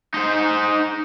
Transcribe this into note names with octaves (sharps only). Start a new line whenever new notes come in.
D#4 C5